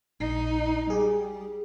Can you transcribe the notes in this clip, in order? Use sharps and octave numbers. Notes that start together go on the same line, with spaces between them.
A#1 D#4
G3 G4 G#4